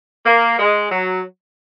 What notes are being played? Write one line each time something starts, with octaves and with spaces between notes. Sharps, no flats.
A#3
G#3
F#3